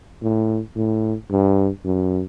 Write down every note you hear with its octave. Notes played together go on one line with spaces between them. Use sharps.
A2
A2
G2
F#2